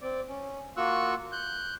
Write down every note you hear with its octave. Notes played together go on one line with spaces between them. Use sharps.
C4 D5
C#4
A#3 F4 F#4 C#6 E6 F#6
F#6 G6